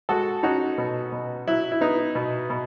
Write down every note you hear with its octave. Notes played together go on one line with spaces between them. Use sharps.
G#3 F#4 A4
C#4 D#4 F#4
B2
B2
F#3 E4
E4
B3 D#4
B2
B2